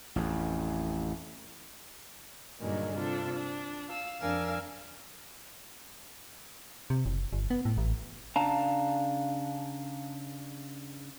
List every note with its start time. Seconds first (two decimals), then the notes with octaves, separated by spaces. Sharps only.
0.16 A1 F2
2.60 G2 A#2 D3 D#3 F#3 G#3
2.96 C3 D4 F4 A4
3.35 D4
3.89 F5 E6
4.21 F2 D4 A#4 F5 G#5 E6
6.90 C3
7.06 F#1
7.33 G1
7.50 B3
7.65 A2
7.78 A1
8.36 C#3 D4 F5 A5 A#5